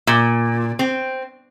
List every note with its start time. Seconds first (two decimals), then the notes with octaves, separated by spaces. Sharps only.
0.07 A#2
0.79 C4